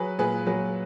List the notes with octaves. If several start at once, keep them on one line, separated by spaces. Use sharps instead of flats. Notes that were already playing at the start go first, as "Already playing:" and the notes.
Already playing: F#3 G#4 B4
A#2 G#4 B4
F#3 G#4 B4